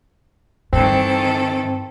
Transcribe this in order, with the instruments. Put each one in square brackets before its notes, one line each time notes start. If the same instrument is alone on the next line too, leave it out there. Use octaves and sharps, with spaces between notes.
[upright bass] G2 [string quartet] D#3 E3 A4 [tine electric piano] C4